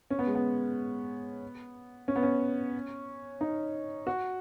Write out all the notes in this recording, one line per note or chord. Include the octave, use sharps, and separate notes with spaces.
C#4
B3
G#3
B3
C#4
B3
C#4
D#4
F#4